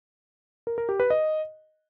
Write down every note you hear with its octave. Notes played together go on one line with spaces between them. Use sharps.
A#4
A#4
G4
B4
D#5